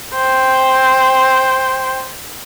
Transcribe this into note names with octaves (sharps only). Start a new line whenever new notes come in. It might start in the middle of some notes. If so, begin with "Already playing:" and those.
C5 G5